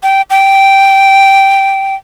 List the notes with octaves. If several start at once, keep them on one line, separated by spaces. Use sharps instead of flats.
G5
G5